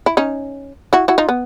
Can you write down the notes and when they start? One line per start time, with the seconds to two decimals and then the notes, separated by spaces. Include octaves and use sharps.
0.06 E4
0.17 C#4 D#4
0.93 E4 F#4
1.08 E4 F#4
1.18 D#4 F4
1.29 B3